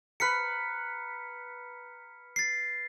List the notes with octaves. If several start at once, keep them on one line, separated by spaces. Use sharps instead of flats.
B4 A#5 F6 B6 C#7
A6 C7